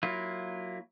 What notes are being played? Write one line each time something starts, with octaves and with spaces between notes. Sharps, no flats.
F#3 A#3 E4 F4